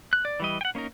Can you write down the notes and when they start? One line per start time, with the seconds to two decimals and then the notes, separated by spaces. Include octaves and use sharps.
0.13 F#6
0.25 D5
0.40 E3 G3 D#5
0.61 F#5 G5
0.75 A#3 C#4 D#4 A#4